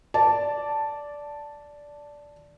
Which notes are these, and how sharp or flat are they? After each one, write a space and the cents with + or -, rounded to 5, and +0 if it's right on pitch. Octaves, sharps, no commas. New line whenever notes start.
D5 -10 A5 +0